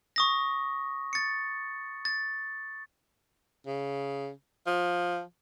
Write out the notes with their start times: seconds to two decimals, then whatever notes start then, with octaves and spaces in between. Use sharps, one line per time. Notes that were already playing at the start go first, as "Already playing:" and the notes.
0.16 C#6 D#6 A#6
1.13 A6 C#7
2.05 A6
3.67 C#3
4.67 F3